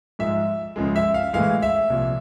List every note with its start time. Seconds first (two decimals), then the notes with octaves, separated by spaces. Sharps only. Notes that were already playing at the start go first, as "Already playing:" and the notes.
0.19 G#2 F3 G#3 E5
0.76 C#2 C#3 F3 G#3
0.96 E5
1.14 F5
1.33 A2 E3 G#3 F5
1.62 E5
1.90 C2 A#2 F3